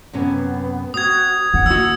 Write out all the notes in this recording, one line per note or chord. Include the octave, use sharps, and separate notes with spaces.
F#2 C3 B3 C#4
C4 F#4 D#6 G#6
C#4 F#5
D#2 F#4 E6